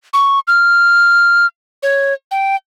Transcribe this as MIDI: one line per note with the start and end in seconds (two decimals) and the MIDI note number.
0.14 0.39 85
0.48 1.46 89
1.83 2.13 73
2.31 2.56 79